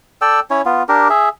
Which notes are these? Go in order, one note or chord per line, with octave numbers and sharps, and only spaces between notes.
A4 D5 G5 E6
C#4 E4 C#5
B3 F4
D4 G4 A#4
G#4 E5